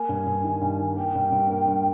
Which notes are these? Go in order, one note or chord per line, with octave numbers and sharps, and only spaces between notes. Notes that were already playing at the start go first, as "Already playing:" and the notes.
Already playing: A#3 G#5
G2
G2
D#3
G2
D#3
A#3 G5
G2
G2
A#3
G2